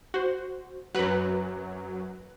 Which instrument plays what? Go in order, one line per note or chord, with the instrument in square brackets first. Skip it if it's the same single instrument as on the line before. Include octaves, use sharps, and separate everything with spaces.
[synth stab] F#4 C5
[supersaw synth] F#2 F#3 [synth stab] B4 F#6